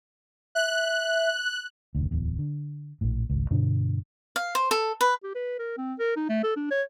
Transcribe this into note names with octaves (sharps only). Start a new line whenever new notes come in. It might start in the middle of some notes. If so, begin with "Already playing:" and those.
E5 F#6
F1 D2
D1 E2
D3
A#1 A2
G#1 C#2
G2 B2 D3 D4
F5
C5
A4
B4
G4
B4
A#4
C4
A#4
D#4
A3
A4
D4
C#5